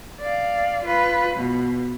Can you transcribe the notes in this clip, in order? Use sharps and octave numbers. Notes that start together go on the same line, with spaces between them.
D5 F5
F4 B4
B2